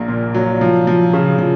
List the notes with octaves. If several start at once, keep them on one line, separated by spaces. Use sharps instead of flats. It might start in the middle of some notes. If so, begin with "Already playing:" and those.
Already playing: A#1 A#3
A#2
F#3
F3
F3
C#3
F3